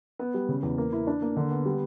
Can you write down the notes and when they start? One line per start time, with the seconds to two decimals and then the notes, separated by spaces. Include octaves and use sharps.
0.19 B3
0.34 G3
0.49 C#3
0.63 E2
0.78 A#3
0.93 E4
1.07 D4
1.22 A#3
1.36 D3
1.51 B3
1.65 G3